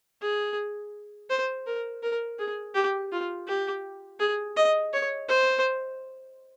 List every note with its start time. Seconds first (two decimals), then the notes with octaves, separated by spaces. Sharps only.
0.22 G#4
1.30 C5
1.67 A#4
2.03 A#4
2.39 G#4
2.75 G4
3.12 F4
3.48 G4
4.20 G#4
4.56 D#5
4.93 C#5
5.28 C5